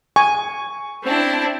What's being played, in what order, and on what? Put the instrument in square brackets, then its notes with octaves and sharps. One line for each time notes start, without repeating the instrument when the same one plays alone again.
[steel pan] G#5 [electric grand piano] C#6
[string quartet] C4 D4 E4